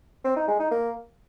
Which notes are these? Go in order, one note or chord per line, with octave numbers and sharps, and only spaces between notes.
C4
D#4
G#3
D#4
A#3